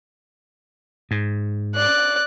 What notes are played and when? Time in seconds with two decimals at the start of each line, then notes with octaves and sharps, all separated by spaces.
1.11 G#2
1.75 D5 F#6